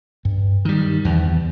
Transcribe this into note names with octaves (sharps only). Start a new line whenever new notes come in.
G2
D#3 G3
E2